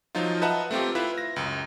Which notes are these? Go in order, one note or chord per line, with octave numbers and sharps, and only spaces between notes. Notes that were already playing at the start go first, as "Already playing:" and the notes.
F3 F#3 D#4 F4
B4 D#5 E5 F#5 A5 A#5
A3 C4 F4 G4
E4 F4 B4 E5
A#6
C#2 F#2